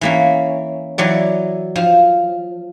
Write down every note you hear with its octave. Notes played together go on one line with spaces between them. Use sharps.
E3 A#3 C#4
E3 F#3 D5
F3